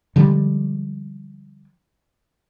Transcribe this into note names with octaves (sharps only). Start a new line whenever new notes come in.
D3 F3 G3 G#3